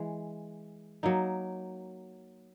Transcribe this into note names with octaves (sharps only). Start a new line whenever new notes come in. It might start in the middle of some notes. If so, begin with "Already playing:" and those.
Already playing: E3 G#3
F#3 A#3 D#4